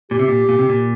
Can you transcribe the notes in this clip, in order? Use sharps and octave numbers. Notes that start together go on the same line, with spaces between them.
A#2 G4
C3
A#2
A#2
C3
A#2